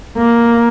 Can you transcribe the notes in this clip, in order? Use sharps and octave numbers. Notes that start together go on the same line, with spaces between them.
A#3